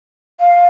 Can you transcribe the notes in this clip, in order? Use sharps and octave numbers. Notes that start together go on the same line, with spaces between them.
F5